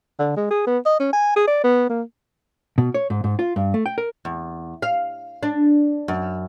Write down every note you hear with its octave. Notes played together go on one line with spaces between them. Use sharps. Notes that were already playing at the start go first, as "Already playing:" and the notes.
D3
G#3
G#4
B3
D#5
C#4
G#5
G#4
D5
B3
A#3
B2
C#5
G#2
G#2
F4
G2
A3
G5
A#4
E2
F5
D4
F#2